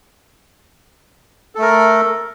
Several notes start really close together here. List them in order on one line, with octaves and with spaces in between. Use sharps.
A4 A3 A#4